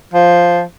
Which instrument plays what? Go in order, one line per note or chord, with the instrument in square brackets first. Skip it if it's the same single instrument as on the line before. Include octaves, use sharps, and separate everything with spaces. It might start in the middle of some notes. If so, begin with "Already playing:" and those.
[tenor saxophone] F3